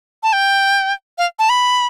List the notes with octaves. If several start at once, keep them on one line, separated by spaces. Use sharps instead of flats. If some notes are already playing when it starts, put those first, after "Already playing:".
A5
G5
F5
A5
B5